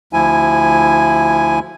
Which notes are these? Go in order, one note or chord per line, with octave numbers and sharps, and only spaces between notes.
D2 F3 E4 G#5